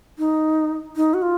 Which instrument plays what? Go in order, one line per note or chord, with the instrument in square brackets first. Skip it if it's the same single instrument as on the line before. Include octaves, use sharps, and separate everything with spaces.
[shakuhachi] D#4
D#4
F#4
F4